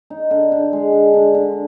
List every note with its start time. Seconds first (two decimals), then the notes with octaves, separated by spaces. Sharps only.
0.10 D#4
0.31 D3
0.52 D3
0.73 G#3
0.93 D3
1.14 D3
1.34 D3